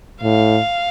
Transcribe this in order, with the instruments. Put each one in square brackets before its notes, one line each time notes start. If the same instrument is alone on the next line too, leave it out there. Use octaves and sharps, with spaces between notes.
[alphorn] A2 [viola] F5